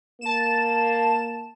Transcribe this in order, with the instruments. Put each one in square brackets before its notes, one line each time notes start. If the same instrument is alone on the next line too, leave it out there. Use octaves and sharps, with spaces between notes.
[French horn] A#3 [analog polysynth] A5 E7